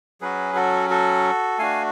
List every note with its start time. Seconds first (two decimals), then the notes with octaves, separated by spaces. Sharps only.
0.21 F#3 C#4 F#4 G#4 B4
0.55 F#4 A4
0.90 F#4 A4
1.58 A3 D4 F#4 F5 G#5